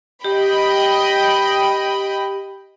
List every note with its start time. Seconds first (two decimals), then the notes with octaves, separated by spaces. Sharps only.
0.24 G4 D#5 G5 B5